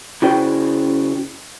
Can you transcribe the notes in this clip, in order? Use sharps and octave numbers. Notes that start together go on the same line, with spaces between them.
C#3 E4 F#4 C5 D5 G5